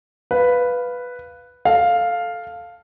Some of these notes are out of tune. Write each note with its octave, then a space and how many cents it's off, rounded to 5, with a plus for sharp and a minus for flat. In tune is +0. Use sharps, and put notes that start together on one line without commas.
B4 +0 F5 +0
A4 +0 F5 +0